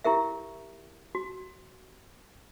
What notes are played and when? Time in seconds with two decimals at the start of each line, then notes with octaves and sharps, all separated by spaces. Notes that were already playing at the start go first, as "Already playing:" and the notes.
0.04 E4 G4 A#4 E5
1.15 F#4